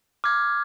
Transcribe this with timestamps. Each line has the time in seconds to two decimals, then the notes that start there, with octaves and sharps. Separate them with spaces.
0.24 D6 F6 G#6